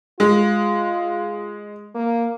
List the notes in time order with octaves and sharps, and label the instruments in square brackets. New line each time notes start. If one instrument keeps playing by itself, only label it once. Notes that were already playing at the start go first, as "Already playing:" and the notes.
[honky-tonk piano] G#3 [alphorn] F4
[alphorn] A#3